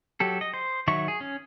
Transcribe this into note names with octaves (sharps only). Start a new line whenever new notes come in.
F#3 G4 A4
D#5
C5
D#3 F#3 E5 C#6
G#4
C#4